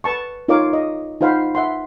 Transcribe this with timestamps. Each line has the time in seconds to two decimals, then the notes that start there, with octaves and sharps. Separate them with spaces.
0.04 B4 A5 C#6
0.48 D#4 F4 A#4 C#5 F5 D6
0.73 D#5
1.21 D#4 F4 C5 F5 F#5 B5
1.55 E5 F#5 C6